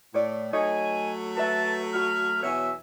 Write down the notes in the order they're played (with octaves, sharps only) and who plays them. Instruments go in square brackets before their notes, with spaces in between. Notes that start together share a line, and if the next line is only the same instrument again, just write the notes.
[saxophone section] A2 [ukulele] C#5 D5
[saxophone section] F#3 A3 [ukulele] D#4 C#5 D#5 [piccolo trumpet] G#5
[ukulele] B4 E5 [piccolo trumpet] A5
[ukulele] F#4 B5 [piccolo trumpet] F6
[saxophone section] E2 B2 F#3 [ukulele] C#5 G#5 [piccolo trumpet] E5